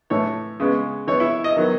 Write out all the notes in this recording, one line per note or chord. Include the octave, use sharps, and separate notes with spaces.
A2 E3 A3 C#5
C#3 G#3 B3
E3 B3 C#5
E4
D#5
D#3 F#3 B3